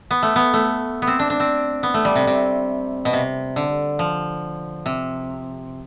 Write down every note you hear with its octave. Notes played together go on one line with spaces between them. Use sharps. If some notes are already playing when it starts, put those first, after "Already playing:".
B3
A3
B3
A3
B3
C4
D4
D4
C4
B3
A3
G3
C3
C3
B2
C3
D3
F3
C3